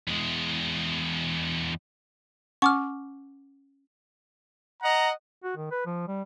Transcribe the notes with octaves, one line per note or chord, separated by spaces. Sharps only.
E2 G#3
C#4 F#5 C#6 D6 F6
D#5 F#5 A#5
F#4
D#3
B4
F3
G3